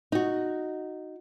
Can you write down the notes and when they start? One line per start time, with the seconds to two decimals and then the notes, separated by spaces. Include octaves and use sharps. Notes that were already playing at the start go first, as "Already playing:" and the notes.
0.12 D#4 F#4